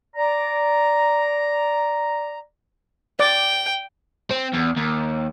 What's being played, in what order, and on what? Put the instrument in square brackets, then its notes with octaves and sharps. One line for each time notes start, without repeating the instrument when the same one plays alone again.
[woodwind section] D5 A#5
[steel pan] D5 D6 [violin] G5
[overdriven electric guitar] C4
E2
D#2